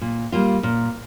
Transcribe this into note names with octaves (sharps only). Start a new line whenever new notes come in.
A#2
G3 A#3 F4
A#2